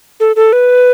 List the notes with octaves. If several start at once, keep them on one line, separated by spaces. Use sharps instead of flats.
A4
A4
B4